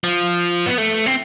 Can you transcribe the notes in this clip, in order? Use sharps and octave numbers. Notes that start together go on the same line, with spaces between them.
F3
B3
A3
C4